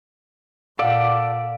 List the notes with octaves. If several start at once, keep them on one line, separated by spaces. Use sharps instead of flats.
A#2 A4 D5 F5 F#5